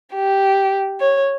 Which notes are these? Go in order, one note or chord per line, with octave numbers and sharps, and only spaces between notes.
G4
C#5